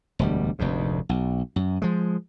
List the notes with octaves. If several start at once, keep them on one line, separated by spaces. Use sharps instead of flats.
E1 D2 G3
F1 D2 G#2
B1
F#2
F3 G#3